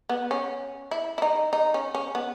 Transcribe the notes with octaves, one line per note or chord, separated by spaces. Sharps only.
B3
C#4
E4
E4
D#4
D#4
C#4
C#4
B3